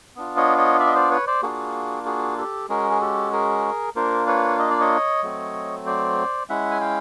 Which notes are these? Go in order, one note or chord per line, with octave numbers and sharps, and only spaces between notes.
B3 D4 F4
C#5 D#5
C#5 D#5
D5 E5
D#5
C5 D5
B4 C#5
C5 D5
A#3 D4 F4 F#4 G#4
F#4 G#4
G4 A4
G#3 C#4 F#4 G#4 A#4
G#4
G4 A4
G#4 A#4
A#3 D4 F4 A#4 C5
B4 C#5
D#5
D5
C#5 D#5
F#3 A3 C4
C5 D5
G#3 C#4 E4 E5 F#5
G#5
F5 G5